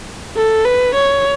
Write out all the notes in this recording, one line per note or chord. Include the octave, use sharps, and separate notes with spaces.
A4
B4
C#5